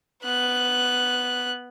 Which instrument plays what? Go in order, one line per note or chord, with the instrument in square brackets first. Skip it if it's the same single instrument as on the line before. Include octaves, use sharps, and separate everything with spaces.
[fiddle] B3 F#6